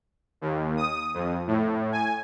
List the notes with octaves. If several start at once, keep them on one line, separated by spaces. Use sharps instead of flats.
D#2
D#6
F2
A2
G#5